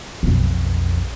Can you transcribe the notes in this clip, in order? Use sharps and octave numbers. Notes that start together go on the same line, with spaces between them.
B1 F2